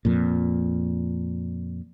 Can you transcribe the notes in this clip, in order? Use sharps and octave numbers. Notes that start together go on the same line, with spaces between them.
F2 A#2